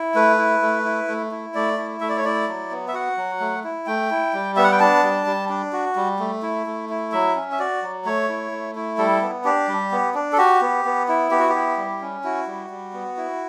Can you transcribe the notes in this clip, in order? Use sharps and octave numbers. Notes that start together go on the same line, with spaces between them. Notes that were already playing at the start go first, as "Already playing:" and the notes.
Already playing: E4
A3 B4
E4
A3
E4
A3
E4
A3 D5
E4
A3 E5
D5
C#5
E4 D5
F#3
B3
E5
F#4 F#5
F#3
A3
E4
A3 G5
E4
G3
B3 E5
F#5
G5
D4 A5
G3
G3
D4
F#4
G3
A3
E4
A3
E4
F#3 E5
C#4
E5
F#4 D5
F#3
A3 C#5
E4
A3
E4
G3 A4
B3
D4 G4
G3
B3
D4
A4
F#4 G4
B3
B3
E4
B3 G4
F#4
G4
E4
G3
C#4
E4 F#4
G3
G3
B3
E4